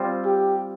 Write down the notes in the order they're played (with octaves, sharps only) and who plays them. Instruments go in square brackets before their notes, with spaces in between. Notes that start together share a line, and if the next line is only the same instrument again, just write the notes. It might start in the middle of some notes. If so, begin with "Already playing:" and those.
Already playing: [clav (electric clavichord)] G3 C4 F4 C5
[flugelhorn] G4